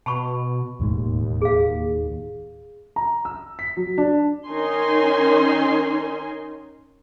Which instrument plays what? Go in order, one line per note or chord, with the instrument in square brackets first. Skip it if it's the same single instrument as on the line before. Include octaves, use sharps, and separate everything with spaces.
[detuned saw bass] B2 [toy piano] A5 B5 C#6
[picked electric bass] E1 A2 G#3 [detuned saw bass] D#2
[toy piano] G#4 F5
[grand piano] A#5
E6
B6
F#3
D4
[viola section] D#3 C#4 D#4 A#4 G#5 C6